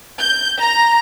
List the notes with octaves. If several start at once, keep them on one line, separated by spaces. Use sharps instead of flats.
G6
A#5